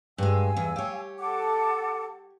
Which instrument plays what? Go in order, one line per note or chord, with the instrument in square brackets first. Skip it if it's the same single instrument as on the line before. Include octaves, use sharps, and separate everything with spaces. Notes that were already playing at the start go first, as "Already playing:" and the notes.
[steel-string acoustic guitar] G2 G#3 [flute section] F5 G#5 E6
[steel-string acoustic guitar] E2
G4 C#5
[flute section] A4 F#5 D6